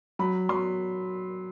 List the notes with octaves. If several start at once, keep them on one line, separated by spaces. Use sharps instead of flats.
F#3 B5
F#3 C6